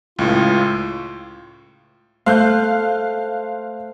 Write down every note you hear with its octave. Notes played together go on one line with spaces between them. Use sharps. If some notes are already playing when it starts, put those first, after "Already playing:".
C#2 A2 F4
A3 C5 F5 F#6 G6